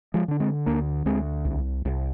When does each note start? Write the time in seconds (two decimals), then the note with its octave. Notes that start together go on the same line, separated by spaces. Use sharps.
0.14 F3 G#3
0.28 D3 D4
0.40 G#3 C4
0.66 D2 A#3 D4
1.06 D2 G#3 C4
1.45 C2
1.85 C2